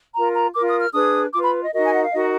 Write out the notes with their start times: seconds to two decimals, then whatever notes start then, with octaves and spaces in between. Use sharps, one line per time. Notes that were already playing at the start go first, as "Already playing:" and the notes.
0.15 F4 A#4 A#5
0.34 A#5
0.54 F4 A#4 D6
0.68 D#6
0.81 F6
0.93 D4 G#4 B4 D#6
1.33 F4 B4 D6
1.43 B5
1.63 D#5
1.73 D#4 F#4 A#4 D#5
1.84 G#5
1.93 F#5
2.03 F5
2.12 D#4 F#4 A#4 D#5